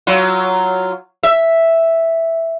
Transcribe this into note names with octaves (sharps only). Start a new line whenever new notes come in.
F#3 F4
E5